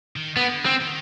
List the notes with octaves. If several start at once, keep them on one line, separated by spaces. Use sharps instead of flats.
D#3
D3 B3
C4
D#3